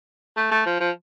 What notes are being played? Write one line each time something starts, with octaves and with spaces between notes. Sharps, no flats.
A3
A3
F3
F3